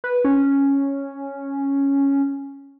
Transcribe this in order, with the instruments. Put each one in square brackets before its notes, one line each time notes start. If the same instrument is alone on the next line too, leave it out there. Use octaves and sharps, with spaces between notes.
[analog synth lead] B4
C#4